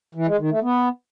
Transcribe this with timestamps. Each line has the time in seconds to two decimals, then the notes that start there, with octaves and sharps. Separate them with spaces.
0.15 E3
0.27 G#3
0.39 D#3
0.50 A3
0.62 B3